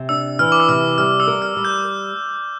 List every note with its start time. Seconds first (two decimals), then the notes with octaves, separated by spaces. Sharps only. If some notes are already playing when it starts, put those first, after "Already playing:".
Already playing: C3
0.09 D4 E6
0.39 E3 F6
0.52 D6
0.60 E6
0.68 C3 F6
0.98 G3 F6
1.20 E6
1.27 A#4
1.42 F6
1.57 G3
1.65 G6